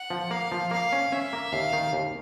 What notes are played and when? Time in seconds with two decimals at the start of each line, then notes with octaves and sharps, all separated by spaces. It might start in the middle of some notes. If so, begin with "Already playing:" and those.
Already playing: F#5
0.10 F3
0.31 A#3 F5
0.52 F3
0.71 A#3 F5
0.92 C#4
1.12 C#4 E5
1.33 A#3
1.52 D#2 F5
1.73 D#3
1.93 D#2